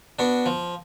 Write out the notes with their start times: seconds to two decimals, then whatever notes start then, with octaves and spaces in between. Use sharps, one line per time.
0.19 B3 D4 F#4
0.46 F3